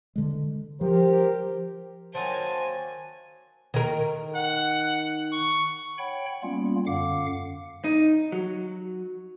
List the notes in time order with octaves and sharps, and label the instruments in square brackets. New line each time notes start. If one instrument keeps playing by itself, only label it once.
[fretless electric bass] D3 G#3
[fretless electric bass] F3 [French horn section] G4 A#4 C5
[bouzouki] D#3 F#3 A#3 [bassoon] C5 [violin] G#5 [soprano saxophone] A5
[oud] D#3 A#4
[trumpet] F#5
C#6
[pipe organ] C#5 F#5 G5 B5
G3 A#3 B3 C#4 F4
F#2 D3 F5 F#5 D6
[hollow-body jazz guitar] D#4
F#3